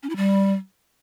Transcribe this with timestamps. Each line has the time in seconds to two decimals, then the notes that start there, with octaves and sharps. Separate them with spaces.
0.03 C#4
0.10 E4
0.16 G3